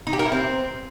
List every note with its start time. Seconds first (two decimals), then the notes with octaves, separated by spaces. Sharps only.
0.07 D#4
0.13 G4
0.19 A#4
0.26 E4
0.32 C4